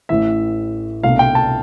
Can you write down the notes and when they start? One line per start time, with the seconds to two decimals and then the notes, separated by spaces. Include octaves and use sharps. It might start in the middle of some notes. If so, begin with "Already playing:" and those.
0.09 A1 A2 E3 E5
1.03 C2 B2 A3 D4 F5
1.19 G5
1.35 A5